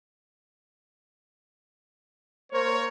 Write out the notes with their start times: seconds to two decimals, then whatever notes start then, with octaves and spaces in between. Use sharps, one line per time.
2.52 A#3 A#4 C5 C#5